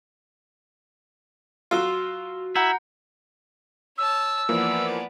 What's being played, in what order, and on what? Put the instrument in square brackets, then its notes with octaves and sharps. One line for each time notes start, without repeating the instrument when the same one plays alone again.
[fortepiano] F#3 F4 [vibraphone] F#4 [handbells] C6 E6
[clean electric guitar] E4 [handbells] F#5 A#5 G6
[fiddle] C#5 A5 [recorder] E6
[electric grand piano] E3 F3 A#3 [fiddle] B3 D5